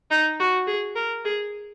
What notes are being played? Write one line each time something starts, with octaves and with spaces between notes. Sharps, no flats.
D#4
F#4
G#4
A#4
G#4